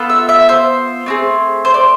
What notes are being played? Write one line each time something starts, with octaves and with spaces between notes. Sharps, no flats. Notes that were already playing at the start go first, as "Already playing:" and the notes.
Already playing: B3 F4 A4
E5
E5
C5
A3 C4 G#4
C5
D5